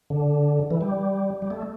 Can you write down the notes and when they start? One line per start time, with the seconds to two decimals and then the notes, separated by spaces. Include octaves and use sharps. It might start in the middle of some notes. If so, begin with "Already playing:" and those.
0.10 D3
0.71 E3
0.81 G3
1.42 G3
1.50 A3